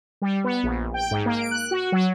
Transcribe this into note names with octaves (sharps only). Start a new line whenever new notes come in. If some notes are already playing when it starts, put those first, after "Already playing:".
G3
B3
A#1
G5
G#2
A#3
D7
F#6
F#4
F#3